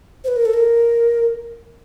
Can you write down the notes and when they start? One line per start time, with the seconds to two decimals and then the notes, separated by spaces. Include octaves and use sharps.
0.24 C5
0.28 B4
0.36 A#4
0.46 A4
0.54 A#4